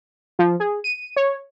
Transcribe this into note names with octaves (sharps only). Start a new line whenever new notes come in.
F3
G#4
D#7
C#5